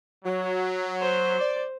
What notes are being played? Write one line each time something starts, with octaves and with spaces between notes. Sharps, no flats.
F#3
C5
D5